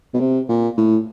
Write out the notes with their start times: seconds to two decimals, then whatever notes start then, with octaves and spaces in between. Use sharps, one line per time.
0.14 B2
0.20 C3
0.49 A#2
0.77 A2